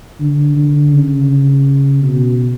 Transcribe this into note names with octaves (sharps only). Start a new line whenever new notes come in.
D3
D3
C#3
B2